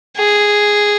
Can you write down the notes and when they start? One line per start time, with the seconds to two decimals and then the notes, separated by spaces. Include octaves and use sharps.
0.18 G#4